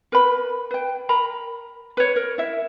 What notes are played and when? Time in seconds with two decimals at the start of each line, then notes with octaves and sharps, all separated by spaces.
0.12 A#4 B4 B5
0.71 B4 G5
1.09 A#4 A#5 B5
1.97 B4 C#5
2.16 A#4
2.38 E4 E5